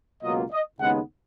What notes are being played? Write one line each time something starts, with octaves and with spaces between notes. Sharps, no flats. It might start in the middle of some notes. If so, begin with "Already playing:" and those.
C#2 B2 F#3 A#3 F4 D#5
D#5
D#2 C#3 G#3 B3 D#4 F#5